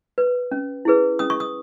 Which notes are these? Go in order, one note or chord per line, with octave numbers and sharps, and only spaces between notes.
B4
C#4
E4 G#4 B4
C#4 D#6
C#6
D#6